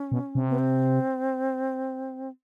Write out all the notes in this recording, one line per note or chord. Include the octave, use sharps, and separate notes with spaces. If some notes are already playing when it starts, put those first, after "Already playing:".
Already playing: C#4
B2
C3
B3
C4